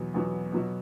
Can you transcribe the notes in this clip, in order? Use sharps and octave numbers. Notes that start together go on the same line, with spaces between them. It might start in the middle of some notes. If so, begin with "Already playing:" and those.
Already playing: E2 B2 F#3 B3
E2 B2 F#3 B3
B2 F#3 B3